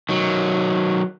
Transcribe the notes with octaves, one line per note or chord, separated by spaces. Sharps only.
D#3 F#3